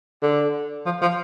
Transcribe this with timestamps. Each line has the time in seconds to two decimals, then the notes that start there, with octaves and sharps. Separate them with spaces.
0.22 D3
0.86 F3
1.02 F3